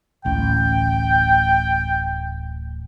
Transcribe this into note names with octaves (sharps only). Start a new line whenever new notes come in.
D1 A1 G5